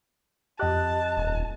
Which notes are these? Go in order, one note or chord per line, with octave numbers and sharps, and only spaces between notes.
F2 G4 D#5 A5 F#6
D#1